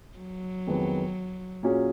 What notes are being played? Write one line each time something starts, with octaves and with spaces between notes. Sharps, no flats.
F#3
F2 D#3 G#3 B3
A#2 F#3 C#4 G#4